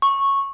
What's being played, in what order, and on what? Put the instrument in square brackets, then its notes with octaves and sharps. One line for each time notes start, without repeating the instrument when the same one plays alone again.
[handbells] C#6